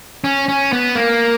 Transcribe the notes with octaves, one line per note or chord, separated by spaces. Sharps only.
C#4
C#4
B3
A#3